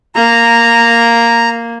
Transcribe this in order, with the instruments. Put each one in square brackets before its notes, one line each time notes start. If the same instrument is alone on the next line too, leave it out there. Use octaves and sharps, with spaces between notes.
[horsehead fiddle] A#3 [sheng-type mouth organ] A#5